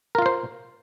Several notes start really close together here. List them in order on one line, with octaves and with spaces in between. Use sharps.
A#4 F4 F5 C5